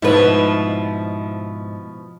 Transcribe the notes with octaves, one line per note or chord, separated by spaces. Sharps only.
G#2 B2 F3 E4 B4